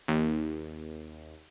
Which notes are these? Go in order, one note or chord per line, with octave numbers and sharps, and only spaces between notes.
D#2